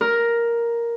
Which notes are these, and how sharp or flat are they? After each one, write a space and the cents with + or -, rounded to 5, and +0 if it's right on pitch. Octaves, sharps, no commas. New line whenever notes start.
A#4 +5